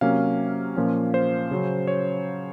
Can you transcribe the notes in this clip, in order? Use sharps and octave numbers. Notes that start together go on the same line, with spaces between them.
C3 F#3 A#3 C#4 F5
A#2 F3 A#3 C#4
C5
C#3 F#3 C#4
C#5